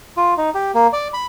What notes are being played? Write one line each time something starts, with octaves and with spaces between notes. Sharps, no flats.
F4
D#4
G4
A#3
D5
B5